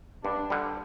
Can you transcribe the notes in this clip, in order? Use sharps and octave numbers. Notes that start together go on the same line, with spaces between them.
G2 D4
D3 G3